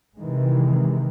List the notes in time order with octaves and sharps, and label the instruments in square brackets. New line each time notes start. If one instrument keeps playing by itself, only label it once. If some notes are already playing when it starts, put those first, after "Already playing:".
[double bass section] C3 D#3 E3 G#3